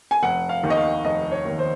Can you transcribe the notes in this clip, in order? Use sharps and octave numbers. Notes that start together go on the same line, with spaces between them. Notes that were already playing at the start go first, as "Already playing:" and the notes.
G#5
F1 F#5
F5
D#2 D#3
D#5
F5
F1 D#5
C#5
D#2 D#3
C5